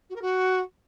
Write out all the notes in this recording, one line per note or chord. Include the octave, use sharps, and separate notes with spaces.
F#4
A#4
F#4